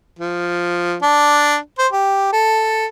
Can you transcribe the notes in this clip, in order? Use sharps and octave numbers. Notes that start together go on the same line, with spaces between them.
F3
D4
C5
G4
A4